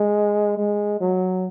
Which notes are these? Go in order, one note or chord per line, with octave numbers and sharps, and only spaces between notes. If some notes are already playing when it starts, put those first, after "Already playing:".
Already playing: G#3
G#3
F#3